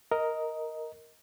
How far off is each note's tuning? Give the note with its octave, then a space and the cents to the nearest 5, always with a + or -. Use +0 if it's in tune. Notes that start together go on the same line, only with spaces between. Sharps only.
A#4 +0 D#5 +10